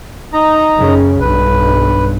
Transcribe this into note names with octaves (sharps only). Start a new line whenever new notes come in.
D#4 A#5
F#2 C#3
B1 G2 B4